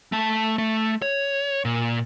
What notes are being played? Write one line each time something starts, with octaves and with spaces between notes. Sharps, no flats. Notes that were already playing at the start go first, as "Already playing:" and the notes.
A3 A5
A3
C#5
A#2